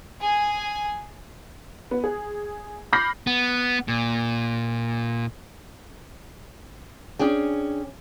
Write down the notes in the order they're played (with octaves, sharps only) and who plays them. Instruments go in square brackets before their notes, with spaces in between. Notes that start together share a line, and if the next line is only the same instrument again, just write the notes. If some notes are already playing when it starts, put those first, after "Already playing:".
[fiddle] G#4 G#5
[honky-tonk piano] B3
G#4
B5 D6 F6 G6 A#6 C7
[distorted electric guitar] B3
A#2
[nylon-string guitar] C#4 D4 G#4 G5